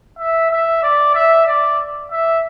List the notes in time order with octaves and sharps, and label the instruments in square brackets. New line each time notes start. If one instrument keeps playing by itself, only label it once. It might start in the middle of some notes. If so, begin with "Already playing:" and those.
[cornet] E5
E5
D5
E5
D5
E5